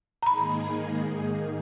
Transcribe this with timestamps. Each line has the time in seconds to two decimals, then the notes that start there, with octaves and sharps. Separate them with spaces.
0.23 A#5
0.26 G#2 D#3 A#3 D#4 G#4 B5